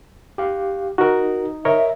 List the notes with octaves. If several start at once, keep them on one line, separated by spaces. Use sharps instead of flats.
G4 F5
D#4 F#4 A#4
A#4 C#5 D#5 E5